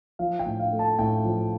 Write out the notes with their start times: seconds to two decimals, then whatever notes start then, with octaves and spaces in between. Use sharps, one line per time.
0.19 F3 F5
0.39 G5
0.46 A2
0.59 F5
0.72 A3
0.79 A5
0.99 A2 G5
1.25 F3